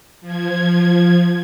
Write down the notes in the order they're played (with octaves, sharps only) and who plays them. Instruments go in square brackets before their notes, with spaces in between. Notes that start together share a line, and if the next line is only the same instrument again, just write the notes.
[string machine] F3 G#6